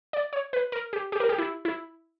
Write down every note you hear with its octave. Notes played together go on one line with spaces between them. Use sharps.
D5
C#5
B4
A#4
G4
G4
A#4
G4
E4
E4